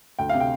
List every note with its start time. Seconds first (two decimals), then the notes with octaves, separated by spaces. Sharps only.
0.19 D2 G5
0.29 C3 F5
0.40 G5